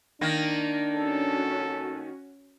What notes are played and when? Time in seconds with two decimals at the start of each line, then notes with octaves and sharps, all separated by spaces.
0.21 D#3 A#3 D4
0.94 C#4 F#4 A4